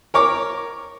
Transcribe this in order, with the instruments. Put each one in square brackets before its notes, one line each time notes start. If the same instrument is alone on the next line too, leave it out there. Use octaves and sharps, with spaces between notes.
[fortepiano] A#4 C#5 D6